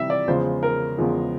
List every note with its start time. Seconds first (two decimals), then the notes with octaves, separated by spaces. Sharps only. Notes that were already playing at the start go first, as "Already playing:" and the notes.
Already playing: C3 E3 G3 E5
0.10 D5
0.27 E2 C#3 F3 G#3 C5
0.63 A#4
0.98 E2 C#3 F3 G#3